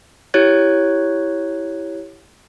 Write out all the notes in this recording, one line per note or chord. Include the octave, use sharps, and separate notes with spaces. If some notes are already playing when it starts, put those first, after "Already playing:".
E4 G4 C#5 F#6 G#6